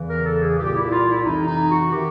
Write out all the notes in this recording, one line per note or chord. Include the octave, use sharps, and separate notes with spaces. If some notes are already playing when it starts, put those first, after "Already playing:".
Already playing: E2 C#3 E3
A#4
A4
G#4
C2 A#2 G4
E4
F4
E4
F2 C3 E3 D#4
D#4
F#4
C3 D#3 G4